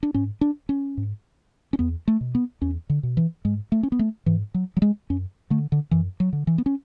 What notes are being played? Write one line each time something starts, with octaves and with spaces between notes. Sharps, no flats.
D4
G#2 C#4
D4
C#4
G#2
C#4
E2 B3
A3
B2
B3
E2 C#4
D3
B2
E3
G#2 G#3
A3
C#4
B3
A3
G#2 E3
F#3
F#3
G#3
F#2 C#4
D3 A3
D3
F#2 E3
F#3
D3
E3
B3
C#4